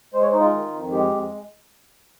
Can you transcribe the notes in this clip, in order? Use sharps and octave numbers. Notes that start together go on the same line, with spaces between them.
G#3 C5
C#5
C5
D#4
F4
D#3
F2
G#3 G4
F2